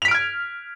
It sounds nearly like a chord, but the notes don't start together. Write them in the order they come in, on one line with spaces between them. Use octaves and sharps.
F7 B6 D7 F6 G#6